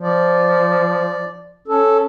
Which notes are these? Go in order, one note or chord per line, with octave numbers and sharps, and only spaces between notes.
F3 D5
C#4 A4